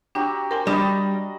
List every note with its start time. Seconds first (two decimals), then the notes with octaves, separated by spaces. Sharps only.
0.15 F#3 D4 F#4 G4
0.51 A#4 C5 G5 G#5
0.67 G3 D4 D#5 B5